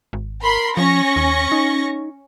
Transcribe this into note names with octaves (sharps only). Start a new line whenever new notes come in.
G#1
A#4 B5 C6
F3 C#4 C#6 A#6
D#2
D#4